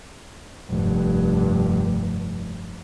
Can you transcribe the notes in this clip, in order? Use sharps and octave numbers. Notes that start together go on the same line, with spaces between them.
F1 G2